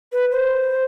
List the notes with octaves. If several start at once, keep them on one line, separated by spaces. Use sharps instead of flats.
B4
C5